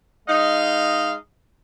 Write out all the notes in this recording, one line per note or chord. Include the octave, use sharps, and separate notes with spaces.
G#3 D#4 D#5 F5